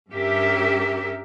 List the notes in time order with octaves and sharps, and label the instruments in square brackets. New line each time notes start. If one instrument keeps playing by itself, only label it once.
[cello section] G2 C#4 G4 A#4 E5